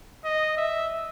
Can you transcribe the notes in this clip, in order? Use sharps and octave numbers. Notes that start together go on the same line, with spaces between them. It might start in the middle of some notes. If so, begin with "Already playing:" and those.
D#5
E5